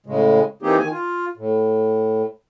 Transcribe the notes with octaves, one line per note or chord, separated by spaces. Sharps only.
A2 C#3 G#3
E3 A#3 C4 D#4 G4 G#4
D#3 G#5
F4
A2